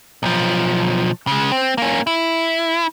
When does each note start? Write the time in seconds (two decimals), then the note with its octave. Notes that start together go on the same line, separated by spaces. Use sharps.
0.23 B1 F3
1.27 C#3 G#3
1.52 C4
1.78 A#3 C#4
2.07 E4